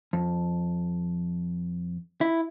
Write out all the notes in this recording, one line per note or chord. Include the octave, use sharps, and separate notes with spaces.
F2
E4